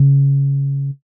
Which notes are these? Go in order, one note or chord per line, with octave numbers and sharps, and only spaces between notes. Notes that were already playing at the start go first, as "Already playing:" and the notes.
Already playing: C#3